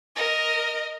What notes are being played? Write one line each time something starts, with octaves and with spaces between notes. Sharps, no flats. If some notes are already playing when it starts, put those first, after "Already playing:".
A#4 D#5